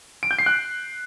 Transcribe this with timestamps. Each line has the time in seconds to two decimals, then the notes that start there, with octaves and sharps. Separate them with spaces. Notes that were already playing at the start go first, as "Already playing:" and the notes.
0.23 D7
0.31 G6
0.39 C7
0.46 F#6